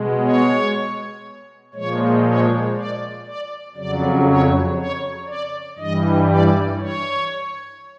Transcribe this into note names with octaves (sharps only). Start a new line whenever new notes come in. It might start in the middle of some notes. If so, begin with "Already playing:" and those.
Already playing: B2 G#3
C#5
A#2 F3 G#3 C#5
C#5
D5
D5
F2 C#3 F#3 D5
C#5
C#5
D5
G2 E3 G3 D#5
D5
C#5